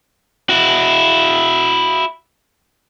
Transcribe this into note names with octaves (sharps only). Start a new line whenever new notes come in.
E4 F#4